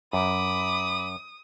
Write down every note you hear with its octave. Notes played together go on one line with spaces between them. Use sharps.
F#2 B5 D6 D#6